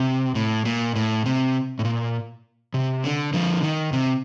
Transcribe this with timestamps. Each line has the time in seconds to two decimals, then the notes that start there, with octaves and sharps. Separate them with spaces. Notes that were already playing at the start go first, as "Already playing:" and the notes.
Already playing: C3
0.35 A2
0.65 A#2
0.95 A2
1.26 C3
1.79 A2
1.85 A#2
2.74 C3
3.04 D3
3.33 D3 F3
3.63 D#3
3.93 C3